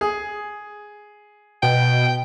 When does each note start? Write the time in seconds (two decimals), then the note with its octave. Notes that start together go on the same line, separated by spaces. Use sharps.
0.01 G#4
1.63 B2 G5